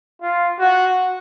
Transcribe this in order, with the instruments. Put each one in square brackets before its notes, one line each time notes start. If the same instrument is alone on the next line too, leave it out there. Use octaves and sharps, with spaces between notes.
[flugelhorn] F4
F#4